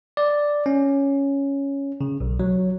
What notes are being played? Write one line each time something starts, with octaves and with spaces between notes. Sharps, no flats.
D5
C#4
C#3
B1
F#3